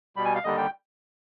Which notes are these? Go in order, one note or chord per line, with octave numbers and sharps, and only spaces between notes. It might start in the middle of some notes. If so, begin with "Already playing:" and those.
B2 G3 B5
G#5
F5
D#2 D3 G3 D#5
G5